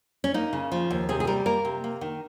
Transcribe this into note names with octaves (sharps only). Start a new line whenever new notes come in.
C#4
A#3 D#4
C#3
F3
D#2
C3 G#4
G#4
G3 A#4
A#3 A#4
C3
A#3
D#3